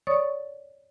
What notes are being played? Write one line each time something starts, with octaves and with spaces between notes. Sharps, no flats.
C#5 D5 C#6 D#6 A6